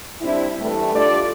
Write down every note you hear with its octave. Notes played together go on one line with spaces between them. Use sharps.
G3 C4 D4 E4
G2 E3 G3 A3
D4 F4 G4 A4 D5